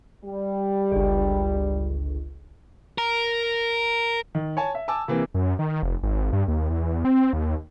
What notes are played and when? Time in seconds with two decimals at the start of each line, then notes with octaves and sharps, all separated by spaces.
0.25 G3
0.91 G1 C#2
2.98 A#4
4.35 D#3
4.57 C#5 G#5 A5
4.75 E5
4.88 G#5 A5 D6 E6
5.08 C3 E3 A#3
5.34 F#2
5.59 D#3
5.83 F1
6.03 G#1
6.33 G2
6.48 D#2
6.70 E2
6.85 E2
7.05 C4
7.33 D#2